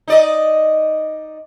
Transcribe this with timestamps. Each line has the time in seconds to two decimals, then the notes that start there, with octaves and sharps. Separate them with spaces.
0.08 D#4 D5 D#5